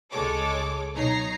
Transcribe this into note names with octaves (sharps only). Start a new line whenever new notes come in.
C#2 G#3 A4 C#5 D6
B1 D#4 C#5 A#5 C7